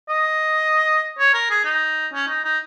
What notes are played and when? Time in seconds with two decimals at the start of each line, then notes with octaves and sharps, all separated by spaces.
0.09 D#5
1.19 C#5
1.34 A#4
1.51 G#4
1.65 D#4
2.13 C#4
2.28 D#4
2.44 D#4